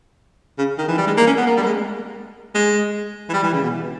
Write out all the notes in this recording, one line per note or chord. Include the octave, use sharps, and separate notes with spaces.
C#3
D#3
E3
G3
G#3
A#3
C#4
B3
A#3
G3
A#3
G#3
G#3
E3
G3
E3
C#3
B2